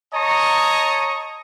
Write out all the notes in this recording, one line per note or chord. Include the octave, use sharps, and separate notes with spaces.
C#5 D#5 A5 A#5 C#6 D#6